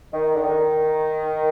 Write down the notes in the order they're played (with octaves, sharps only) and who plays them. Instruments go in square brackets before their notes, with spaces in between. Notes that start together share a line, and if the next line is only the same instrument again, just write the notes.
[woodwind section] D#3
D3
D#3